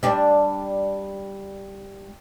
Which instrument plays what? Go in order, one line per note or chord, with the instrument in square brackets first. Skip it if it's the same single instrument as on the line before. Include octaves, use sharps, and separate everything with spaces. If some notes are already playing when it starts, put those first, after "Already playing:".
[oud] G3 D4